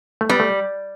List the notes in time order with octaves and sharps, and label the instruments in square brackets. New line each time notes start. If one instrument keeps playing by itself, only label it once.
[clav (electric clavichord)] A3
[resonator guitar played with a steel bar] G3 [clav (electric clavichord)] B3
[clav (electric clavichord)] A3